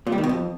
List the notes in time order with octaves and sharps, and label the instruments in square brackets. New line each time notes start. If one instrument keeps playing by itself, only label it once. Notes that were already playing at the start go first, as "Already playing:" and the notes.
[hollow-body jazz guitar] A#2
G3
D#3
B2
F2